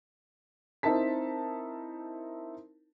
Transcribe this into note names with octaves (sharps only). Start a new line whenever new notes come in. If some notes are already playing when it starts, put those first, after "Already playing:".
C4 D#4 E4 A#4 A5 B6